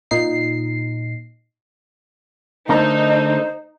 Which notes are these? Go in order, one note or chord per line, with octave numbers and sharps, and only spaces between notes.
A#2 D#4 C7
D3 A3 D#4 A#4 C5